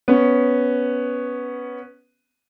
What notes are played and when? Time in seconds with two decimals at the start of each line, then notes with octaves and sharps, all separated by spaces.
0.08 B3 C#4